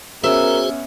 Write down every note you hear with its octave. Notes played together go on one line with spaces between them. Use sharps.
B3 C#4 F#4 G#4 A#4 C5 E5